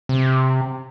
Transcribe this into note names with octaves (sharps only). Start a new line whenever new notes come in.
C3